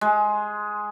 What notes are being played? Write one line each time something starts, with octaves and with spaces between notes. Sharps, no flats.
G#3